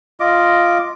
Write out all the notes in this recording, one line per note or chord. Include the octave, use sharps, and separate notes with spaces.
F4 D#5 D6